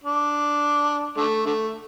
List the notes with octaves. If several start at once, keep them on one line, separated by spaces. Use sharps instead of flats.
D4
D3 A3
D3 A3